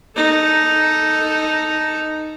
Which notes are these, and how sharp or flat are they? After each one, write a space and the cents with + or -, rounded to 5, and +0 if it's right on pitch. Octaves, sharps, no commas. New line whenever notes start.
D#4 +0 A4 +0